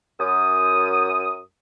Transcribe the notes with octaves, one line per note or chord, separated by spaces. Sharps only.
F#2 D#6